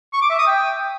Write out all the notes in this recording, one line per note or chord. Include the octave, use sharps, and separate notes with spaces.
C#6
D6
E5
D#6
G5